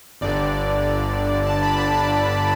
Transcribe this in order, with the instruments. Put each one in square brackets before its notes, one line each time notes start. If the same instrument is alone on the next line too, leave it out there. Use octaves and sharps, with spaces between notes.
[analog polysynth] G1 G2 D3 D5
A5
B5
A5
D5